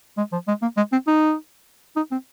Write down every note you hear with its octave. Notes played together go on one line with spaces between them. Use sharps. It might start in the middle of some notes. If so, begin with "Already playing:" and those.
G#3
F3
G#3
A#3
G#3
C4
D#4
D#4
C4